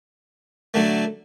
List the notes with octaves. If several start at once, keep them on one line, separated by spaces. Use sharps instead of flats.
D3 F#3 A3